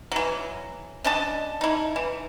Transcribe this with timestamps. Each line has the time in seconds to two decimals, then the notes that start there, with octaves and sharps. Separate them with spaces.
0.12 E3 F#3
1.04 C#4 D4 D#5 A5
1.61 D#4 E4
1.96 E3